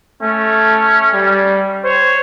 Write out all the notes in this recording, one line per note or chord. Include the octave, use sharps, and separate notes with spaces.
A3 C#4
G3
C5 C#5